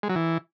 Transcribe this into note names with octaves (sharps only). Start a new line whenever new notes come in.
G#3
F#3
E3